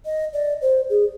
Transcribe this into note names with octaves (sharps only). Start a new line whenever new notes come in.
D#5
D5
C5
G#4